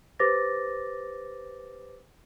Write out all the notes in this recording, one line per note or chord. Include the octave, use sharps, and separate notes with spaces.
G4 B4 C5 D6 A6 A#6